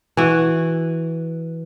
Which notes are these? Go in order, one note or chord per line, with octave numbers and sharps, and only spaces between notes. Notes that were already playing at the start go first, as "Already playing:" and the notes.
E3 F#4